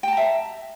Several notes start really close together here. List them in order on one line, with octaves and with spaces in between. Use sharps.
G5 A5 A#5 E5